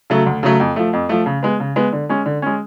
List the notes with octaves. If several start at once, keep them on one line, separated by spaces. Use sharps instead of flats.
C#3 F#3 A3
D2
C#3 F#3 A3
F2
F3 A3
F2
F3 A3
C#3
G#3 B3
C#3
G#3 B3
D3
G#3 C#4
D3
G#3 C#4